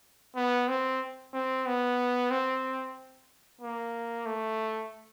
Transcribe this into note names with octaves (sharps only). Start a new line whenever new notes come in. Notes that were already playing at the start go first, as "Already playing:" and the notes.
B3
C4
C4
B3
C4
A#3
A3